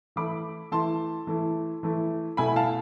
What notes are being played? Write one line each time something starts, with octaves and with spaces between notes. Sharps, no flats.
E3 A3 E4 B5 D6
E3 A3 E4 A5 C6
E3 A3 E4
E3 A3 E4
B2 A3 E4 G#5 B5
F5 A5